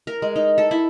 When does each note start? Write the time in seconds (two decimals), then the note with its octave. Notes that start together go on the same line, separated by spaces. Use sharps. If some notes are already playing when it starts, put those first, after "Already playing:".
0.07 A#4
0.22 G#3
0.36 D#4
0.58 A4
0.71 E4